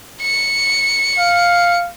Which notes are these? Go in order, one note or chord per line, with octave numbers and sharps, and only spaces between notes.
C#7
F5